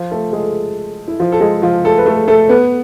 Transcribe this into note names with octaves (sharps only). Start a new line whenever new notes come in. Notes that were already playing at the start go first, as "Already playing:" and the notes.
Already playing: F3 F4
A3 A4
G#3 G#4
E4
F3 F4
A4
G#3 G#4
F3 F4
A3 A4
B4
A3 A4
A3 A4
B3 B4